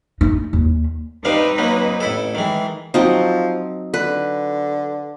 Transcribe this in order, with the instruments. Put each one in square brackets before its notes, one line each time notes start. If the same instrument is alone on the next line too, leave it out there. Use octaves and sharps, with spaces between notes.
[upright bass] D#4
D#2
[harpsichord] C3 G3 F5 [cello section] C4 D#4 B4
[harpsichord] F#3 A#3
A1 E4 A4
[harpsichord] D#3 G#3 [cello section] E3
[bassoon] F3 [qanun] F#3 C4 D#4
[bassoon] D3 [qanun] B4